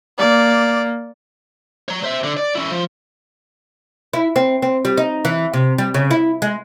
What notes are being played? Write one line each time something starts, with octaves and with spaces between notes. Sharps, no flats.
A#3 D5
C#5 A#5
C5 E5
D3
D5
C#4 E4
F3
E4
C4
C4
G3
D#4
E3
C3
G3
C#3
E4
G#3